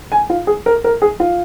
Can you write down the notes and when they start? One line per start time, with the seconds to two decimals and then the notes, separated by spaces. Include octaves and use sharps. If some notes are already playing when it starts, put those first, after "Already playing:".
0.12 G#5
0.30 F4
0.47 G#4
0.66 A#4
0.84 A#4
1.02 G#4
1.20 F4